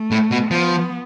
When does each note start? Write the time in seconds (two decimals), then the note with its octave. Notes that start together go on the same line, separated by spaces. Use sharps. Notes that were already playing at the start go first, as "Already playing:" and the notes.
Already playing: A3
0.11 A2
0.31 B2
0.51 F3 B3